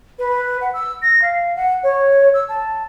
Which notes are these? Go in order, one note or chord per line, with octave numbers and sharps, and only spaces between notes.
B4
F#5
E6
A#6
F5
F#5
C#5
E6
A5